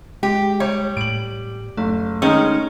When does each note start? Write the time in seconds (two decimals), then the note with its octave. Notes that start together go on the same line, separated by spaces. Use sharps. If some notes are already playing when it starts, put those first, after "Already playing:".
0.23 G#3 G4
0.60 G3 C#5
0.97 A2 D7 F#7
1.77 F#1 A3
2.22 D#3 G#3 C#4 D#4